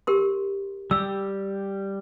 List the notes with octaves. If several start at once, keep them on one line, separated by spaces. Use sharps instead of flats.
G4 A#4 C6
G3 G4 E6